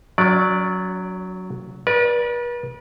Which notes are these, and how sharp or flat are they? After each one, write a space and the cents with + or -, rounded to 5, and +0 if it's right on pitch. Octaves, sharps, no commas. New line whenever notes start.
F#3 +0 C#4 +40 D5 +0
B4 -40 D5 +0